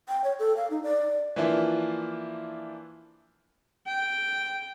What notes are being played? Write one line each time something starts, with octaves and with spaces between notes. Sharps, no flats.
G5
C#5
A4
F5
D#4
D5
E3 F3 A#3 D4 E4 F4
G5